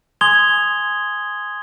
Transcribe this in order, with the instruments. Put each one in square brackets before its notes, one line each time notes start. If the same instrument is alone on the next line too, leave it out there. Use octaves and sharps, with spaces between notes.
[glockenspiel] G#5 C6 D#6 G#6 F7 G7